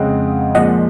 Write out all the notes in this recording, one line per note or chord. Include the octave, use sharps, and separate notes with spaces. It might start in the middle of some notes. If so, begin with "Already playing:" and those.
Already playing: F2 C#3 G#3 C4 D#5 F5 F#5
A#2 F3 G#3 D#5 F#5